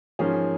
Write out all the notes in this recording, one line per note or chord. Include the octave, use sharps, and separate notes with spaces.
G#2 F3 A#3 C#4 G#4